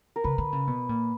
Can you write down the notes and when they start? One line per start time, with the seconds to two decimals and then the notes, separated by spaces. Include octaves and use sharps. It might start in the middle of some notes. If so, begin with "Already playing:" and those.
0.16 A#4
0.24 C#3 B4
0.38 D3
0.52 C#3
0.67 B2
0.89 A#2